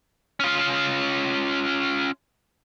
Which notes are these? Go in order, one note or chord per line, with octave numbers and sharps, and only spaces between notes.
C#4 F4